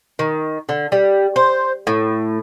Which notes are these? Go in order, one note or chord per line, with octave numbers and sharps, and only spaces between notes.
D#3
D3
G3
C5
A2